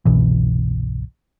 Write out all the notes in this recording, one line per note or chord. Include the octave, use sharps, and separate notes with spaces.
G1 C2 B2 E3